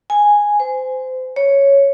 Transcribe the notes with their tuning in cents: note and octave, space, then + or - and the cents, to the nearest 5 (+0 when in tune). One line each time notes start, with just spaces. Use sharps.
G#5 -5
C5 -25
C#5 +0